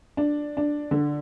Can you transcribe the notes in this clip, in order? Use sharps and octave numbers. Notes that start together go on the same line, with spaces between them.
D4
D4
D3